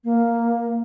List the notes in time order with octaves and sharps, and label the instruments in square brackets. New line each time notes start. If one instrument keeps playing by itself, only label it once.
[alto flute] A#3